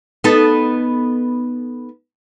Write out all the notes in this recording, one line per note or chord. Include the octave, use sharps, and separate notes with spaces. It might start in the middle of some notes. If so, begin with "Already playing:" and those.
B3 D#4 A4